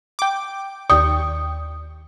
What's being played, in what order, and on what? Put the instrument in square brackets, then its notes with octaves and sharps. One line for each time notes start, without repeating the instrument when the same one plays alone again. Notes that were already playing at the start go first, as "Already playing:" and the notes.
[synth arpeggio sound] G5 D6
[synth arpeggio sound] D#2 G5 C#6 [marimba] D5 D#6